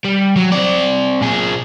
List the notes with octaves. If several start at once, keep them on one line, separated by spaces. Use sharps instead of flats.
G3
F#3
C4 D5
A#2 G#4